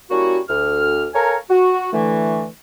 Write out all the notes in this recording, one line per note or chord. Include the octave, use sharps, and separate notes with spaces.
G3 A#3 C#4 E4 F#4
D2 F6
A4 A#4 C#5 F5 G#5 A#5
F#4
D3 E3 A3